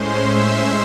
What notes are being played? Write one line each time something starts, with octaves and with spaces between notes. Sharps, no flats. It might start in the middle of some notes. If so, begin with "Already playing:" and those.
Already playing: A2 G#3 C#4 C5 C6
E5 E6